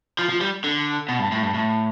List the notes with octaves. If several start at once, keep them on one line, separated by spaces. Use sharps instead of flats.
F3
F3
G3
D3
B2
G2
A2
G2
A2